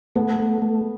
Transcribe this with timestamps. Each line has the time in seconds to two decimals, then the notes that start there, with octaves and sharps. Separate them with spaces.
0.16 A3 B3
0.40 A3
0.62 A3